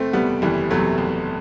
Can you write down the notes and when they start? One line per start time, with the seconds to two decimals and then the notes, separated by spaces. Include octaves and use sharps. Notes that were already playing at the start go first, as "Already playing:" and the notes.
Already playing: F#1 A3 C4
0.13 E2 C3 G3 B3
0.42 F#1 E3 G3
0.70 E2 C3 F#3 A3
0.98 F#1